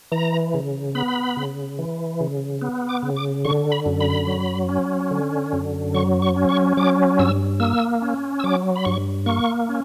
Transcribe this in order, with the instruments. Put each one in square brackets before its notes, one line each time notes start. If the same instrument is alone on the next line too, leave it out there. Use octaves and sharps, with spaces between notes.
[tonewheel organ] E3 A#5
C#3
B3 B5
C#3
E3
C#3
B3
D6
C#3
D6
D3 C#6
B5
F#2
B5
F#3
C#4
D3
F#2
F#3 C#6
C#6
C#4
C#6
F#3 D6
G2 E6
A#3 E6
C#4
E6
F#3 D6
B5
G2 C#6
A#3 C#6
C#4